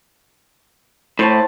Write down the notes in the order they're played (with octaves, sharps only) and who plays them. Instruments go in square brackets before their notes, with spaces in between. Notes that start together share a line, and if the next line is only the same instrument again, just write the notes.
[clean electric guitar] A2 [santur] C5 C#5 A5